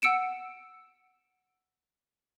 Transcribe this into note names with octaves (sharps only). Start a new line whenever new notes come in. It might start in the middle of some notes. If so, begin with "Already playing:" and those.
F#5 E6 C#7 D7 E7